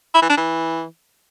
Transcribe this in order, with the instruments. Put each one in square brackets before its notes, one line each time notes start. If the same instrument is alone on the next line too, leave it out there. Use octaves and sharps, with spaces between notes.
[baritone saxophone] E4
E3
D4
E3